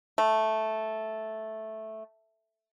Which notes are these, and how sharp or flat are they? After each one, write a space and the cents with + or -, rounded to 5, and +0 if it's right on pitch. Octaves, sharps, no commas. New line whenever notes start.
A3 -5